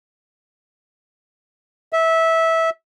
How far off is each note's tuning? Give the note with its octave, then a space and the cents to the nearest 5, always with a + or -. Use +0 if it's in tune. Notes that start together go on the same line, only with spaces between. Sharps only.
E5 -15